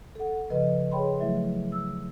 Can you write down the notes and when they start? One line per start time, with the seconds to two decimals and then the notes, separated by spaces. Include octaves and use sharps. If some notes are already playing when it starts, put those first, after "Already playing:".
0.15 A4 F#5
0.50 G2 C#3 F3 B4 D#5
0.91 G#4 C#5 G5 B5 C6
1.20 F3 F#3 A3 E4 E5
1.72 E6